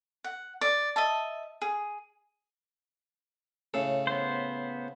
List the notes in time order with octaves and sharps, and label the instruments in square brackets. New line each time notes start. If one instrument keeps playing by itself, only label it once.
[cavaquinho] F#5
D5
D#5 E5 A5
G#4
[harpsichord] A2 C#3 A4
[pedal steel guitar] B3 C5